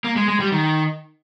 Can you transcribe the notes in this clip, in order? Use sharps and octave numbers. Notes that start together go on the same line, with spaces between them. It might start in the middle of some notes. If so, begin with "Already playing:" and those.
A#3
G#3
G#3
G3
D#3